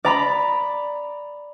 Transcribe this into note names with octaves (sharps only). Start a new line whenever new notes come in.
D5 A#5 B5